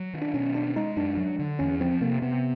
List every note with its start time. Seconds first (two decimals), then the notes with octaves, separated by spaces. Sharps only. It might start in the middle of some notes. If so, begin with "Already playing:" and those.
Already playing: F#3
0.13 D#3
0.22 D4
0.34 B2 C#4
0.55 C#4 D4
0.76 G#3 D#4
0.96 F#2 D4
1.17 F#3
1.39 D3
1.59 E2 C#4
1.80 F3 C4
2.01 C3 A#3
2.22 C3 B3